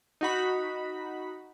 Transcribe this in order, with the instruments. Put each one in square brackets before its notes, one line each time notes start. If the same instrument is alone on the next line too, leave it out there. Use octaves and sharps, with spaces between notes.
[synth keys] D#4 F#4 B5